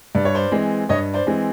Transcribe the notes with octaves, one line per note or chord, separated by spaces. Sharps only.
G2 D5
C#5
C5 D5
E3 G#3 C4
G2 C#5 D#5
C5 D5
E3 G#3 C4